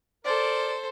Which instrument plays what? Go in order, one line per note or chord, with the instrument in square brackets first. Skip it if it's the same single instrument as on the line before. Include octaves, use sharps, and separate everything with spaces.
[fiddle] A4 C5 [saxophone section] A#4 D5